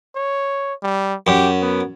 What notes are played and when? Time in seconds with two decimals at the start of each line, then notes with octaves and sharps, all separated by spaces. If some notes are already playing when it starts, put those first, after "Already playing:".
0.16 C#5
0.83 G3
1.27 F#2 G4
1.62 B3